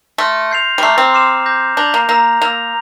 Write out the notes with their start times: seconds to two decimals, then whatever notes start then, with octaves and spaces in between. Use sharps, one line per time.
0.18 A3 C6 F6 A#6
0.51 G6 C7 F7
0.78 G3
0.82 A3 A#5 D6 F6 C7
0.98 C4
1.14 D6 F6 C7 E7
1.46 D6 G6 A#6
1.77 D4 G6 A#6 F7
1.94 A#3
2.09 A#3 A#5 E6 A#6
2.42 A#3 E6 A#6 F7